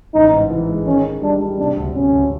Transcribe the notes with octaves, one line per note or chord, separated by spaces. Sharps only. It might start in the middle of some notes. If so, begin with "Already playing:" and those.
A1 D#4
G#2
E3
G#3
D#3 C#4
D#3
G3 D4
G3
C3 D4
D2
C3 C#4
D2